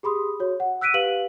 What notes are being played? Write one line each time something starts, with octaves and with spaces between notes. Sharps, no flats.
G4 G#4 B5 C6 D#6
F#4 C#5
F#5
E6 F#6 B6 D7 D#7
G4 B4 F5 F#7